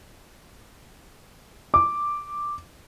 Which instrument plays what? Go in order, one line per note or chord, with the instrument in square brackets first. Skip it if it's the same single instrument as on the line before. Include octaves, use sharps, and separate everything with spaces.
[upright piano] D6